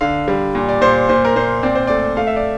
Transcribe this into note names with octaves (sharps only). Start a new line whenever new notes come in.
D3 F5
G3
A#2
D5
A#2 C5
A#2 C5
A#4
A#2 C5
C4 D5
C5
A3 D5
A3 F5
E5
D5